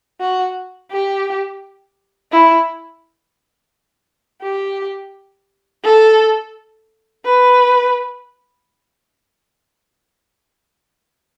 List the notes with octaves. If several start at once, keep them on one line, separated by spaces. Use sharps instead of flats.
F#4
G4
E4
G4
A4
B4